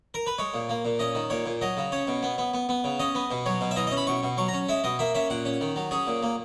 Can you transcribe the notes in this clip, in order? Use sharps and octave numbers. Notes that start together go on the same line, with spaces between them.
A#4
B4
G#3 C#5
A#2
A#3
A#2
C#4 D#5
D#3
A#2 C#5
A#2
F#3 D#5
C#3
C#4 C#5
B2
B3
B3
B3
B3
C#3
C#4 D#5
B3
B2
F#3 C#5
B2
E5
E3 D#5
D#5
C#4
B5
B2 C#6
B2
F#3 C#6
A#5
C#4
G#3 E5
B2 D#5
A#3 E5
C#4 E5
A#2 F#5
C#4
D#3
F#3
C#4 G#4
A#2
A#3